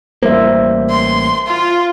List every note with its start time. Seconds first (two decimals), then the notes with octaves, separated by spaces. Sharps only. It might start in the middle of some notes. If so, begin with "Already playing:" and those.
0.23 A1 G3 A#3 C5 E5
0.89 C6
1.46 F4